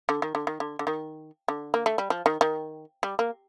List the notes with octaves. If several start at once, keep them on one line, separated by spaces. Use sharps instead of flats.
D3
D#3
D3
D#3
D3
D3
D#3
D3
A#3
A3
G3
F3
D#3
D#3
G3
A#3